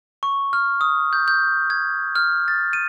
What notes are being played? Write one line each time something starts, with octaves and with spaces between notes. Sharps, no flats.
C#6
F6
D#6
G6
G6
G#6
F6
A6
D#7